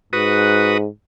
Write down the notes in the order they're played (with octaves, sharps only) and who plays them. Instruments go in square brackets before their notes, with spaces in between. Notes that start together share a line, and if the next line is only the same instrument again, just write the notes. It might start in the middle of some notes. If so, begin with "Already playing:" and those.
[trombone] G#2 [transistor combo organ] F#4 B4 D#6